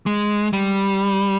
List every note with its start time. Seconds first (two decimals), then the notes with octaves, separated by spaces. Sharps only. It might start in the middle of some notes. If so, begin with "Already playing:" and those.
0.06 G#3
0.53 G3